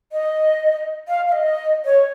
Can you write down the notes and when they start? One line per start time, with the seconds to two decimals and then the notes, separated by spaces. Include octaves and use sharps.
0.12 D#5
1.08 F5
1.28 F5
1.32 D#5
1.85 C#5